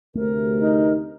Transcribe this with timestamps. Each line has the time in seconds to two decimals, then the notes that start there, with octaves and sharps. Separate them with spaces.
0.15 D2 C3 A3 A#4
0.56 D#4